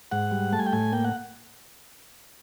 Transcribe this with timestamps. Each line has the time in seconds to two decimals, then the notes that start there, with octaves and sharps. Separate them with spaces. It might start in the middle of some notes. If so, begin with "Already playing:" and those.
0.11 G#2 F#5
0.31 G3
0.52 A3 A5
0.59 G#5
0.66 G5
0.73 A2 G#5
0.93 A#3 G5
1.04 F#5